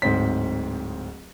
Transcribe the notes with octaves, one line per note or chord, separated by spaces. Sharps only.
D1 G#2 C4 B6